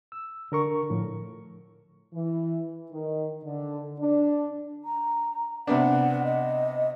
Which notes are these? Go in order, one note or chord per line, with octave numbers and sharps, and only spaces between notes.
E6
D3 A#4 C#6
A2 F3
E3
D#3
D3
D4
A#5
C3 B3 D4 F#5
D#5